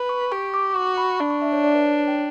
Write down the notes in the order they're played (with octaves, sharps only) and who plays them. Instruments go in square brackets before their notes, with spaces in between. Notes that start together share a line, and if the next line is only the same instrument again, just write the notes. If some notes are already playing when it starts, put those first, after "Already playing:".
Already playing: [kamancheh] B4
[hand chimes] C#6
[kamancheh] G4 [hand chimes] C#6
[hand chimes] D6
[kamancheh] F#4 [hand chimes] C#6
[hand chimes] B5
[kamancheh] D4 [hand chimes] C#6
[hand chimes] C#6
E5
C#5
D5
B4
C#5
D5
G5